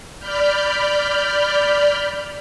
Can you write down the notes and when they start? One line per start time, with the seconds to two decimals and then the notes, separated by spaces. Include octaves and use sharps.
0.18 D5 B5 F6 G6